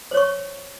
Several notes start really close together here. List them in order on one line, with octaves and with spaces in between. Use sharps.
C5 C#5 C#6